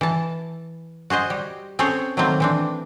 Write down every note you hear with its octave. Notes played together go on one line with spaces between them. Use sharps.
E3 A5
F#4 G#4 C5 D#5
G3
C4 C#4 G#4 A4 C5 C#5
D#3 F#3 A3 A#3 C4
E3 C4 D4